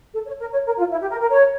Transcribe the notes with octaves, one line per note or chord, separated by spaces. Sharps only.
A4
C#5
A#4
C#5
A#4
F4
E4
G4
A#4
A#4
C#5